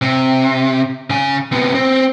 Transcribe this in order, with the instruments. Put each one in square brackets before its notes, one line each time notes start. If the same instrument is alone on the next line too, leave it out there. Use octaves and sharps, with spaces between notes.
[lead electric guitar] C3
C#3 G#5
C3 B3
C4